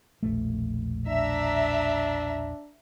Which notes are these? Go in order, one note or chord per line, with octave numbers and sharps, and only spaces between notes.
E1 A#1 A3
D4 E5 A#5